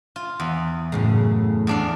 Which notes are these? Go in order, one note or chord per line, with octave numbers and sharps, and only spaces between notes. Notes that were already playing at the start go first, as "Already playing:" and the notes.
F4
E2
F#2 A2 C#3
E2 D4 F5